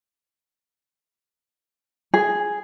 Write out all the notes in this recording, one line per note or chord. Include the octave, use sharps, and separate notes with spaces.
G#4